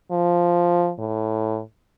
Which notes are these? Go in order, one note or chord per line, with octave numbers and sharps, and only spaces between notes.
F3
A2